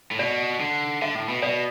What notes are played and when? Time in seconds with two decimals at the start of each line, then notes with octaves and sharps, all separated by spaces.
0.11 A2
0.19 B2 D5
0.60 D3
1.02 D3 E5
1.15 A2
1.29 B2
1.43 B2 D5